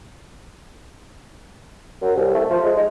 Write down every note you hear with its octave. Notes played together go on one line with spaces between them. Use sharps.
F#2
C2
A3
F3
G#3
D#4